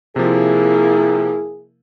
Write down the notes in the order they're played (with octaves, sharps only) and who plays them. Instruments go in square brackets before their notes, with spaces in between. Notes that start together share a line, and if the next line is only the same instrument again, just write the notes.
[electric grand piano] C3 F3 [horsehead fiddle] A#3 E4 [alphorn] G#4